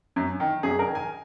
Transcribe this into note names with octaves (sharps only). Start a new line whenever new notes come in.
F#2
D#3
F#2 G#4
A#4
D#3
G#5